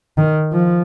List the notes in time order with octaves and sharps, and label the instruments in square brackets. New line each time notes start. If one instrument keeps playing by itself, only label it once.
[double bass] D#3
F3